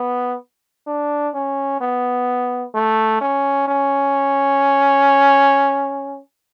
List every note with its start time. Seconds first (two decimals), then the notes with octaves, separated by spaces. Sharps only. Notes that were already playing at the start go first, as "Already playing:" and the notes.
Already playing: B3
0.87 D4
1.34 C#4
1.81 B3
2.74 A3
3.21 C#4
3.67 C#4